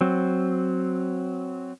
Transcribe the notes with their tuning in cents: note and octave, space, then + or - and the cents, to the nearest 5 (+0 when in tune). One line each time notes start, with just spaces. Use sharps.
F#3 +0 C4 +0